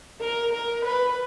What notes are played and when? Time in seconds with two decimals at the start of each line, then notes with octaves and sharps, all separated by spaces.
0.21 A#4
0.52 A#4
0.85 B4